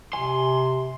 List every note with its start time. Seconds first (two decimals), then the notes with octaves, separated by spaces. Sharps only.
0.13 C3 G#5 C6